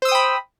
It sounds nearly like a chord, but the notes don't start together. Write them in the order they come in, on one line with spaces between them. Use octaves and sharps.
C5 E6 D#6 G5 B5